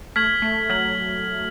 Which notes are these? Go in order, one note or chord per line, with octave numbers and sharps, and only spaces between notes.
A3 F6 G#6 B6 F#7
A3
F#3 F6 G#6 B6 F#7